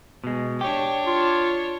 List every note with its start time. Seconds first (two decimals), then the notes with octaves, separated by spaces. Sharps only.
0.24 B2 G#3
0.61 D4 G4 C#5
1.06 F4